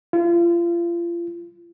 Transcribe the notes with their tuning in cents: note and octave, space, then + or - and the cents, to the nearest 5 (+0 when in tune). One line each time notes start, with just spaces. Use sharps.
F4 -35